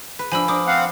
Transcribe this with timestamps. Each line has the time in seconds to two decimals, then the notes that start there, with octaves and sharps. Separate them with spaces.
0.19 B4
0.32 F3 D4 G#5 B5 E6
0.48 D4 A#4 C5 D6 D#6
0.67 C4 F5 F#5